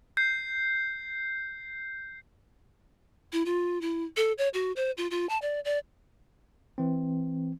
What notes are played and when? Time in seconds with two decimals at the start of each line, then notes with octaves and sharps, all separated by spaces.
0.17 G6 C7
3.33 E4
3.46 F4
3.81 E4
4.17 A4
4.38 C#5
4.54 F#4
4.76 C5
4.98 F4
5.11 F4
5.29 A5
5.42 D5
5.65 D5
6.78 E3 C4